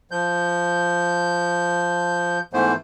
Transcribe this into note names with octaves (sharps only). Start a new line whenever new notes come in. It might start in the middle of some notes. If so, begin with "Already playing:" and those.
F3 G6
G#2 E3 A3 B3 C5